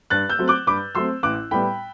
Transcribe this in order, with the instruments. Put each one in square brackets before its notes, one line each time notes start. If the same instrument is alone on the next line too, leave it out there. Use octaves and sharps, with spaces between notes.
[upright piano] G2 F#6 A6
E6 G6
F#3 A3 C4
D6 F#6
G2 B5 D6
F#3 A3 C4 C6 E6
A1 D6 F#6
A2 G3 B3 G5 B5